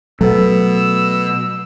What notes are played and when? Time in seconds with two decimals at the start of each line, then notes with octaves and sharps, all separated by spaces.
0.21 B2 F#3 A3 B3 E6